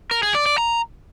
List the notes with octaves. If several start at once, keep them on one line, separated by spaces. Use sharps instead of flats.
A#4
G#4
D5
D5
A#5